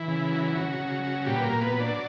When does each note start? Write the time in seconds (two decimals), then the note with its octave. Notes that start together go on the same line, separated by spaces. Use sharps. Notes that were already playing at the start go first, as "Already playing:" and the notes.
Already playing: E3 E4
0.08 C#3
0.32 F#3
0.55 C#3 F#3 F#4
0.80 C#3
1.03 F#3
1.26 A#2 G3 G4
1.35 B4
1.44 A#3 A#4
1.50 A#2
1.61 B3 B4
1.73 F#3
1.80 D4 D5